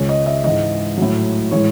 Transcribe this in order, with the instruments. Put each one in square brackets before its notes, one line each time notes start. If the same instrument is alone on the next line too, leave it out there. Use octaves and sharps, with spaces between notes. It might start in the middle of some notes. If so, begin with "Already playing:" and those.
Already playing: [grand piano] C#2 C#3 G#3 C#5
D#5
E5
G#2 E3 G#3 D#5
A2 F#3
A2 E3 G#3 C#5